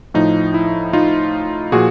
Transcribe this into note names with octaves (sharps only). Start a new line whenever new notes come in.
A2 F3 D#4
E4
D#4 F4
A#2 F3 F#4 G#4